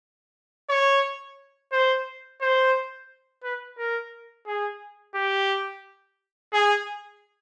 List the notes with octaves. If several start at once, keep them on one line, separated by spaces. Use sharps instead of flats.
C#5
C5
C5
B4
A#4
G#4
G4
G#4